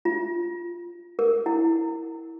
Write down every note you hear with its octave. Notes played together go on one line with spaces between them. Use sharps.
F4
A#4
E4